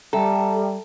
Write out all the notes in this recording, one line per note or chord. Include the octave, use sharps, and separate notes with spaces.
G3 A4 E5 G5 A#5